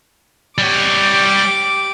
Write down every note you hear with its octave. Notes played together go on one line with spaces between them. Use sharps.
G3 G4 C#5 D6